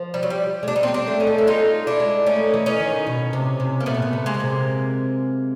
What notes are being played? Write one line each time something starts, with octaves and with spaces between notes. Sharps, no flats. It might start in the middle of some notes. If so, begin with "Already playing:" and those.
Already playing: F3
G3
F#3
G3
G#3
G3 D4
D#4
C4 D4
G3
C4 D4
A3
C#4 D#4
A3
E4
G#3 D#4 F4
D4 E4
G#3
A3 C#4 D#4
E3
E3 C#4 D#4
D#3
B2
C3
C3
A#3
A#2 A3 B3
B2
A#2
C3
G#3 A#3
C#3
C3